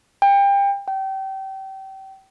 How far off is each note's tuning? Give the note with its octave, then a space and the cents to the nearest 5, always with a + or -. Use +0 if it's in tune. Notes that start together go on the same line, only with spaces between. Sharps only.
G5 +30
G5 -30